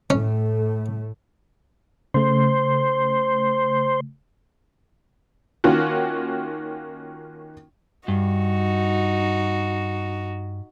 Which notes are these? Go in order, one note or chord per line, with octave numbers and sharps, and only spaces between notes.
A2 A3 C#4
C#3 A3 C5
D#3 A#3 C#4 F4 F#4
G2 D#4 F#4